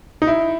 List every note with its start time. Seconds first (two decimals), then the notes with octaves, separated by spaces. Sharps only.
0.22 D#4
0.27 E4